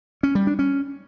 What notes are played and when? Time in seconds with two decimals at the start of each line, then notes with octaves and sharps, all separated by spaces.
0.23 C#4
0.35 G3
0.47 D4
0.59 C#4